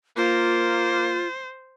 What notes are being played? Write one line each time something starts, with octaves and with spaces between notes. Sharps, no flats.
A#3 F4 C5